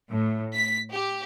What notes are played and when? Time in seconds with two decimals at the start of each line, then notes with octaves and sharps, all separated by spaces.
0.11 A2
0.54 B6
0.90 G4